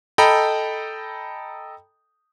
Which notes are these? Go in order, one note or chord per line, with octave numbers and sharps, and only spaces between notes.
A4 D#5 G5 A#5 B5